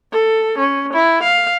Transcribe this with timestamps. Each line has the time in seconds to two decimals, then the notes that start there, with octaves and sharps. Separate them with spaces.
0.12 A4
0.58 C#4
0.93 E4
1.23 F5